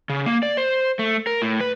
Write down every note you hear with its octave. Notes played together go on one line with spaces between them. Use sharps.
C#3
A#3
D5
C5
A3
A#4
A2
B4